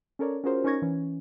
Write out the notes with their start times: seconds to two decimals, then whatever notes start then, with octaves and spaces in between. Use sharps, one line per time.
0.19 C#4 A4 A#4 C#5 D5
0.44 C#4 F4 F#4 G#4 A#4 C5
0.64 C#4 D#4 A#4 C#6 G#6 A#6
0.82 E3 C#4